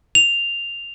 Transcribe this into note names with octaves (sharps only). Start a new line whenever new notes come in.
F7